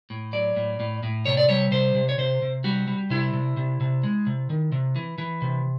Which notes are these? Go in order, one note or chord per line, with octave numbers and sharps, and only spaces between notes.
A2
F#3 D5
A2
A2
A2
C3 C#5
D5
G3 C#5
C3 C5
C3
C#5
C3 C5
C3
G3 F#4
G3
C3 E4
C3
C3
C3
G#3
C3
D#3
C3
E3
E3
C3